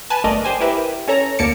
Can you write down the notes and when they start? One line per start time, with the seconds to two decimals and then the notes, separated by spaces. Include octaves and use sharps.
0.10 B4 G#5 A5
0.24 G1 A3 A#4 D5 D#5
0.45 G4 C5 G#5
0.60 E4 G4 A#4 B4 E5
1.08 C#4 A4 C#5 A#5
1.39 D2 A#3 A5 D6 C#7